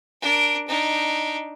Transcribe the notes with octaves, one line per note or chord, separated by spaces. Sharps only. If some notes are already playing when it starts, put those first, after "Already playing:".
D4 A#4
D4 D#4